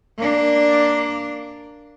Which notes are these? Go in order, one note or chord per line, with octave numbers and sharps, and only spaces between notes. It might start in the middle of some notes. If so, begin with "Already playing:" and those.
A#3 D4